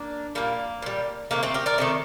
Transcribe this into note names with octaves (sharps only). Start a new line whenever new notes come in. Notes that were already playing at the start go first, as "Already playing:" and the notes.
Already playing: A#3 D4
A#2 G3 A#3
A#2 G3
C3 D#3 A3 A#3
A3 C4
G4 A#4
A#4 D5
C3 D#3 A3 D#5